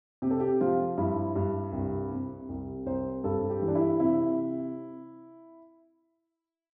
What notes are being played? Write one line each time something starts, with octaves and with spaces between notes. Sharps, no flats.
C3 G4
A4
G4
F3 F4
G2 E4
G2
C2
C3
C2
C2 C5
G2 A4
G4
E3
D4
E4
C3 E4